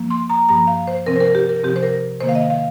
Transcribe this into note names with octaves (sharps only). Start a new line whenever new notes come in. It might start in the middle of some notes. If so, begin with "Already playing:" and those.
Already playing: G2 F3 A#3
C6
A#5
G2 F3 A#3 A#5
F5
C5
C3 F3 C4 A#4
C5
A#4
G4
A#4
C3 F3 C4 G4
C5
A#4
C3 D#3 A#3 C5
F5
D#5
F5